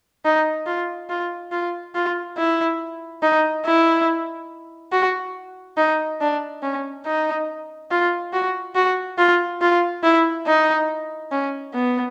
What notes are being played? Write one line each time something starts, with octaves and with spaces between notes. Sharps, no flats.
D#4
F4
F4
F4
F4
E4
D#4
E4
F#4
D#4
D4
C#4
D#4
F4
F#4
F#4
F4
F4
E4
D#4
C#4
B3